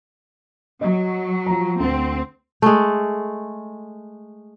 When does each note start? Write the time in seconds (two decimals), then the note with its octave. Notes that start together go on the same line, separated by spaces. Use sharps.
0.81 F#3 D#5
1.46 F3 A#5
1.80 D2 C4
2.62 G#3 A3